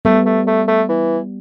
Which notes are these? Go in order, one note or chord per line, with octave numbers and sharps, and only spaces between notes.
G3 A3 B3
A3
A3
A3
E3